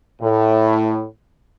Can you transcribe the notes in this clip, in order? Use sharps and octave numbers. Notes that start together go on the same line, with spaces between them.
A2